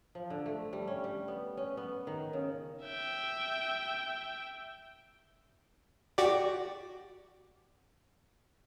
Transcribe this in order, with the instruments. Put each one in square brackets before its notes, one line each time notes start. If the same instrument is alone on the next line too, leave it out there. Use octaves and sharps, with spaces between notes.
[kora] F3
D3
A3
G3
C#4
G3
B3
C#4
B3
D#3
C#3
[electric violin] E5 G5
[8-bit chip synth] F#4 G4 D5